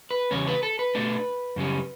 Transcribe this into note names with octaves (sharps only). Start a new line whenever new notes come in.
B4
E2 C#3 G3 C#4 C#5
B4
A4
B4
B2 A3 D4
F#2 C#3 G3 C#4